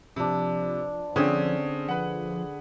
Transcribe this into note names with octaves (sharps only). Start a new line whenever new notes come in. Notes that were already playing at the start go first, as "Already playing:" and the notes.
C3 F3 D4 B4
D3 C4 C#4 G#4
F3 B4 F#5